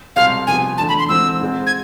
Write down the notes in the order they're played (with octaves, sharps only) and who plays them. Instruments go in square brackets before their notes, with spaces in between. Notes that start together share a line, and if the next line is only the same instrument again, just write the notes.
[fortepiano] C2 B2 G#3 C4 [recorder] F5
[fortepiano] C2 C3 F3 B3 [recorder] G#5
[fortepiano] E2 D3 A3 [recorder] A5
[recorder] B5
C6
[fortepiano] G#2 E3 A3 C4 [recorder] E6
[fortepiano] G#2 G#3 C4
[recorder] G#6